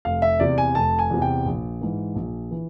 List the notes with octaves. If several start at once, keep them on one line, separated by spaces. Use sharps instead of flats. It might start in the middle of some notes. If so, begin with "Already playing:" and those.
F1 F5
E5
E2 C3 D5
G#5
F1 A5
G#5
E2 C3
G5
A#1
G#2 E3
A#1
E3